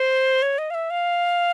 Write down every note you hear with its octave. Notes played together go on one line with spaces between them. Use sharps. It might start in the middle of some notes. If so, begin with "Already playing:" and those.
Already playing: C5
C#5
D#5
F5
E5
F5